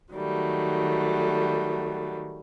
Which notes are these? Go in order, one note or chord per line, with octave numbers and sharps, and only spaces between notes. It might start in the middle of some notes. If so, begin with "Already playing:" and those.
D#3 F#3 G3 A3